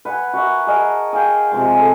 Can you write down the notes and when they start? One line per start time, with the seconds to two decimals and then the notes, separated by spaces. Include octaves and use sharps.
0.05 B4 F#5 G#5
0.33 F#4 A#4 B4 E5
0.67 G#4 A#4 D#5 A5
1.13 G#4 F5 G5 C6
1.51 C3 F3 G#3
1.74 A4 G#5